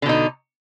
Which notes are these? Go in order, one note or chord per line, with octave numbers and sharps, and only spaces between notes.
B2 D3 D#4